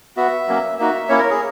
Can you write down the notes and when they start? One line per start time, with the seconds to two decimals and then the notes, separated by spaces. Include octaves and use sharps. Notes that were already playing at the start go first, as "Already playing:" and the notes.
0.17 B3 F#4 E5
0.48 F#3 A#3 C#4
0.79 A#3 D#4 F#4 E5
1.09 A#3 C#4 E4 C#5
1.19 A#4
1.30 G#4